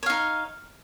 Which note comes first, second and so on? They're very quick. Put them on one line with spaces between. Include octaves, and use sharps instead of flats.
C#5 F5 D#4